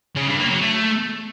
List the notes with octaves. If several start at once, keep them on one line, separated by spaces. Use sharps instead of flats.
C#3
G2
A#3
F#3
A3